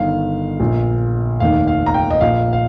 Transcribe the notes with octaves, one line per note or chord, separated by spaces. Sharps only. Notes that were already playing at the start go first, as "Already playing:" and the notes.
Already playing: G1 G2 D#3 F5
A#1 A#2
F1 D#2 D#3 F5
F5
A#5
G5
D#5
A#1 A#2 F5
F5